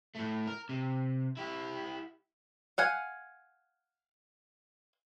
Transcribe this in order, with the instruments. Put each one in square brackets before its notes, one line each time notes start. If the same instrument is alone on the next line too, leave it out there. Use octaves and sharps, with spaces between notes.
[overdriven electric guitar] A2 A3
A#4
C3
E4 G4
[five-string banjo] F5 F#5 G#5